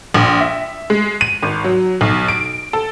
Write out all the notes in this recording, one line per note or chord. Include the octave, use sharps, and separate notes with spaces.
A#1
E5
G#3
D#7
G#1
F#3
B1
D7
A4